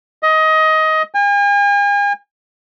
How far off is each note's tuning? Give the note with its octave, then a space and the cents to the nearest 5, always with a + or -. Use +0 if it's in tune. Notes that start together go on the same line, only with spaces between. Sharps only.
D#5 +20
G#5 -45